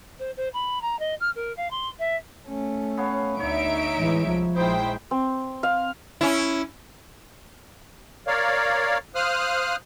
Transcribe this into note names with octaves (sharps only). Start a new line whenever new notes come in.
C5
C5
B5
A#5
D#5
F6
A#4
F5
C6
E5
A3 C#4
B3 C#5 F5
D2 D3 D#4 C#5 E5 D7
A2 E3 G#3
C2 F3
A#1 G#3 D#4 E4 C5 G5
C4
F5
C#4 E4
A#4 C#5 D5 F5
C5 F5 D#6 F6 F#6